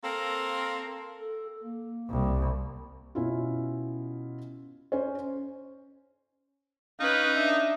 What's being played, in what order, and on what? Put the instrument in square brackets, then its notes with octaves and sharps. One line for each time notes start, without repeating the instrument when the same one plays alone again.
[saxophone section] A#3 C4 A4 A#4
[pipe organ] A4
A#3
[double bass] C2
[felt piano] B2 C#4 E4 F4
C#4 C5 C#5
[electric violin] C#4 B4 [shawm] D#4 [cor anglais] F5
[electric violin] D4 [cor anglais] E5